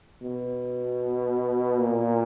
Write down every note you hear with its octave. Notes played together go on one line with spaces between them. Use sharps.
B2
A#2